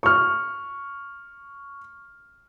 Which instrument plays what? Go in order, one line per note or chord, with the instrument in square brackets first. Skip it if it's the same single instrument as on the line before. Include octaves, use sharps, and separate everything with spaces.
[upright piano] C#6 F6